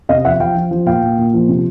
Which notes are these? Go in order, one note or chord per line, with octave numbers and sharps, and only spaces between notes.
C3 D#5 F5
F3 E5 F#5
F3 F5 G5
F3
F3
A#2 F5 G5
A#2
A#2
F3
C3